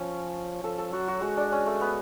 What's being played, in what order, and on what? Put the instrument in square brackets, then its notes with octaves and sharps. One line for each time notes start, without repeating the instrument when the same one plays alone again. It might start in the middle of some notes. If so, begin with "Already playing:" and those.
Already playing: [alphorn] F3 [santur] C#4
[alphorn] F3 [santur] A4
[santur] A4
[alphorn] F#3 [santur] F#4
[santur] F#4
[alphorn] G#3 [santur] F#4
[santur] D4
C#4
A3
B3